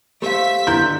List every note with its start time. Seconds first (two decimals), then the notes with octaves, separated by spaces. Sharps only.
0.22 A3 G4 C5 E5 F5 B6
0.67 D3 D#3 B3 E4 C6 G6